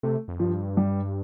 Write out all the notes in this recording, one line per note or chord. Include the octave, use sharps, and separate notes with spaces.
C3 A3
F2
G2 F3
G3